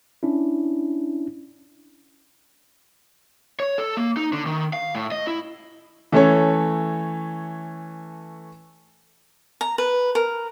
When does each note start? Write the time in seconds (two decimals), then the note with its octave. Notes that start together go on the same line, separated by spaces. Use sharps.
0.23 C#4 D4 E4
3.60 C#5
3.78 A4
3.97 A#3
4.17 D#4
4.33 D3
4.46 D#3
4.73 F5
4.95 A2
5.12 D#5
5.27 E4
6.12 E3 A3 C#4 A4 C#5
9.61 A#5
9.78 B4
10.15 A#4